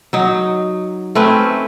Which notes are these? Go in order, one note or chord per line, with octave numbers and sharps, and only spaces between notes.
F#3 D#4
A3 C4 C#4 B4